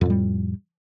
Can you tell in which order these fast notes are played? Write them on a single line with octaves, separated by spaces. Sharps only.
F2 A2 G3